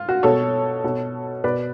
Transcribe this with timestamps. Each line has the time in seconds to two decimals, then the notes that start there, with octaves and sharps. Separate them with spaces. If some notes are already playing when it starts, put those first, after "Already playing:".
Already playing: F4
0.09 F#4
0.23 B2 A4 C#5
0.84 B2
1.44 B2 B4 D5